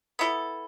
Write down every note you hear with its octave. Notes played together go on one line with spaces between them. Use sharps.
B3 E4 A4